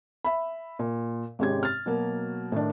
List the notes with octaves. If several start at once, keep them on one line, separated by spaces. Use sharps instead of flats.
E5 B5
A#2
G#1 C3 G#3 C#4 G4 G#6
F6 A6
B2 F#3 A#3
A2 D#3 D4